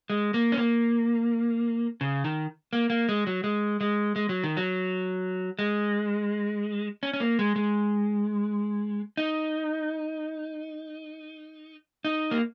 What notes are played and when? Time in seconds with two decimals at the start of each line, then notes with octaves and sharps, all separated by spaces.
0.10 G#3
0.34 A#3
0.52 C#4
0.57 A#3
2.01 C#3
2.24 D#3
2.73 A#3
2.90 A#3
3.09 G#3
3.27 F#3
3.44 G#3
3.81 G#3
4.16 G#3
4.29 F#3
4.44 D#3
4.57 F#3
5.59 G#3
7.03 C#4
7.13 C#4
7.20 A#3
7.39 G#3
7.56 G#3
9.17 D#4
12.05 D#4
12.31 A#3